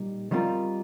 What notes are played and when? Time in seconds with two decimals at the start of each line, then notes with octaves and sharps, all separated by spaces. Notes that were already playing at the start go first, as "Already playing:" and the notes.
Already playing: A#2 G3 D#4
0.31 D#3 G3 C4 F4 A#4